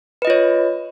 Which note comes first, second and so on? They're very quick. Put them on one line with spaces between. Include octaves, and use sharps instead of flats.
B4 D#5 F4 C#5